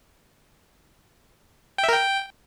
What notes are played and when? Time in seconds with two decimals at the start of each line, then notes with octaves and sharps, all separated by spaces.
1.78 G5
1.83 E5
1.89 A#4
1.94 G5